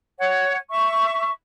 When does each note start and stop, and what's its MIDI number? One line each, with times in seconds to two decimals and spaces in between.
0.20 0.56 73
0.20 0.56 78
0.69 1.29 76
0.69 1.29 85